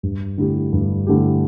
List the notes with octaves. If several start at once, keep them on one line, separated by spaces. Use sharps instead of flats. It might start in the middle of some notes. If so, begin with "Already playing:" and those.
G2
D3 A3 E4 G4
G2
D3 A3 E4 G4